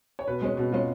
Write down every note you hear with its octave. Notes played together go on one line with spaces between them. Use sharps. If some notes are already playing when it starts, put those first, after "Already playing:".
C#5
B2 B4
G#3 C#4 G#4
B2
G#3 C#4 F4